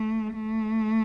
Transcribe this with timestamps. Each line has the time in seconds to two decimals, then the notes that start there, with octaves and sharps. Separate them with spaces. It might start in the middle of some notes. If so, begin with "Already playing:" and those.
Already playing: A3
0.35 A3